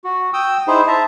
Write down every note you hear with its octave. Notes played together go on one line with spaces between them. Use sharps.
F#4
G5 D#6 E6
D#4 E4 G#4 C5
E5 A5 A#5